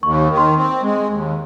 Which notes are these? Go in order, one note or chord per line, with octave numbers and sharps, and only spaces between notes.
D#2 C#6
D#3
C6
C4
G#3
D#2